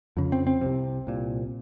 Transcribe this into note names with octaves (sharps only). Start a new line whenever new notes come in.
F2 C#3
C4
C4
C2 C3
C2 A#2